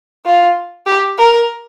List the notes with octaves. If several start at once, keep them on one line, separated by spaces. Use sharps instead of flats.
F4
G4
A#4